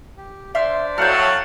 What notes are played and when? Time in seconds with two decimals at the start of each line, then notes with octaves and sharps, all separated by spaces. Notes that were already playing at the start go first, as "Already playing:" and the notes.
0.17 G4
0.55 D4 C5 D5 E5 C6 F6
0.98 A2 F#3 F5 F#5 A5 F6 G6